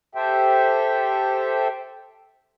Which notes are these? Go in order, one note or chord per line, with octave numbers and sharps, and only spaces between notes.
G4 A4 C5 E5 G5